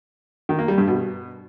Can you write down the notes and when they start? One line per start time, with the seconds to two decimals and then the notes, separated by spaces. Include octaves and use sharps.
0.49 D#3
0.59 A#3
0.68 G3
0.78 G2
0.87 B2